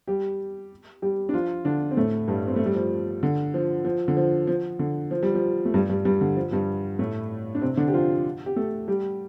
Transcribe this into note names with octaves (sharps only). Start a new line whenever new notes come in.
G3 G4
G3 G4
D4
F3 F4
D3 D4
C4
A2 A3
G2 G3
C4
A3
G3
F3
D3
F3
F3
D3
F3
F3
D3
F3
G3
F3
A3
G2 G3
G2 G3
G2 G3
D3
F3
G2 G3
A2 A3
D4
C3 C4
D3 D4
G4
F3 F4
G4
A3 A4
G3 G4